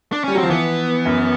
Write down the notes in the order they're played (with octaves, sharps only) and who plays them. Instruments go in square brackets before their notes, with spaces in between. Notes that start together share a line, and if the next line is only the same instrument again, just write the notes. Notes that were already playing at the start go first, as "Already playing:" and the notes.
[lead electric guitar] D4
[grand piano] G3 [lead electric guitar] C#4
[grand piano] F#3
[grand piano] F3 [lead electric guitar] C4
[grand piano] E3 [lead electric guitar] B3
[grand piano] F#2